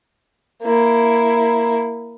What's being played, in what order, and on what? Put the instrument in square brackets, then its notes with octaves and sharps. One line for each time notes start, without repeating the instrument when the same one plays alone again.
[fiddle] A#3 E4